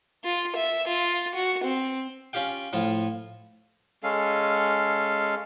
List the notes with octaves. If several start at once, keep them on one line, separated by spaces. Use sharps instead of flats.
F4
E5
F4
F#4
C4
C#4 F4 G4 F5 G5
A2 F3 F4
G#3 C#4 A4 F5